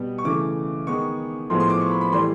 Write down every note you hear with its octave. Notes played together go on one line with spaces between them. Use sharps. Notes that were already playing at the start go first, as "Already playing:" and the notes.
Already playing: B2 G3 B3
C#6
C#3 E3 A3 D6
D#3 G#3 B3 C#6
A2 F3 G#3 B3 C6
C6
D6
C#6
B5
B5
A2 E3 G3 C6